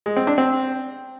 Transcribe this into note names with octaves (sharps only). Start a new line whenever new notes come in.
G#3
C4
D4
C4